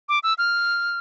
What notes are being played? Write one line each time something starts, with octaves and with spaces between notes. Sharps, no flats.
D6
E6
F6